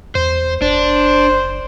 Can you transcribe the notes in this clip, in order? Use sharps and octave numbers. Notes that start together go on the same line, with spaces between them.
E2 C5
F#1 D4 C5